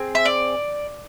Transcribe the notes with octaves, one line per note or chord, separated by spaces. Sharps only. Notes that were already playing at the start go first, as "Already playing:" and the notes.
Already playing: C4 G#4
E5
D5